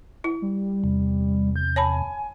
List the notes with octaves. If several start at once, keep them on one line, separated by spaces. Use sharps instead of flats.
E4
G3
E2 C3
G6
C#5 G#5 A5 B5